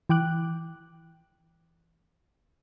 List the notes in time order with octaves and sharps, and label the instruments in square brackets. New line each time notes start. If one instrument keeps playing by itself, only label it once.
[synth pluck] E3 G5 D6 F#6